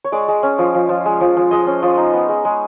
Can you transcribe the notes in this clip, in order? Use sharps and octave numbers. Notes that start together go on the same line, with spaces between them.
C#5
G#3 D5
G#3
C#4
F3
F3
F3
G#3
F3
F3
G#3 D#5
C#4
F3
D#4
B3
G#3
G#3